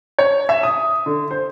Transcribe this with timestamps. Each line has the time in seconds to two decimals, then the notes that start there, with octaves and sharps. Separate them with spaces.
0.19 C#5
0.49 E5
0.63 D#6
1.06 D3
1.31 C5